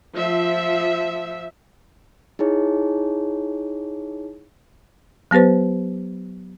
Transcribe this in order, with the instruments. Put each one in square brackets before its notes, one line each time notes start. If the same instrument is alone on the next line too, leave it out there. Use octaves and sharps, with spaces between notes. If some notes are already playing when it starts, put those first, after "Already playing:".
[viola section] F3 E5
[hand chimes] D#4 E4 G#4 C#5
[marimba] F#3 B3 G4 B4 C5